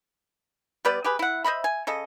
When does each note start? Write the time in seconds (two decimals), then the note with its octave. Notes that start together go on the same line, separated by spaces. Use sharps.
0.85 G3 B3 B4 D5
1.04 G4 G#4 B4
1.19 E4 F#5
1.44 C5 D#5 E5 B5
1.64 G#5
1.87 C#3 A4 D#5